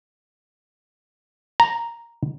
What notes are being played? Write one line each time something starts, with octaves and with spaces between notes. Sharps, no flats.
A#5